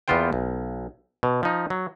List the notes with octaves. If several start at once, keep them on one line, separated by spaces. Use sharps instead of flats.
E2 A#3 B3 F4 C5 G5
B1
B2
F3 D#4
F#3